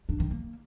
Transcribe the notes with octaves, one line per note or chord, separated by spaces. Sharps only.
D4
D#3
A#3